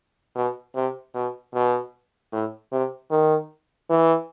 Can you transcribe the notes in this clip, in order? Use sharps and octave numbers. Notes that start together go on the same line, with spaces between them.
B2
C3
B2
B2
A2
C3
D#3
E3